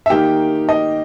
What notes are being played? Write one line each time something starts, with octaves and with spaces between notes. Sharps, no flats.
E5
D#3 A#3 D#4 G4 G5
D#5